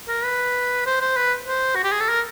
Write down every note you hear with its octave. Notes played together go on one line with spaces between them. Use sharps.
A#4
B4
C5
C5
B4
C5
F#4
G4
G#4
A4
A#4